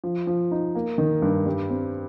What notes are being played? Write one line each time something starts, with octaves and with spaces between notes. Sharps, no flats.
F3
F3
D#4
A#3
D#3
G2
G3
C4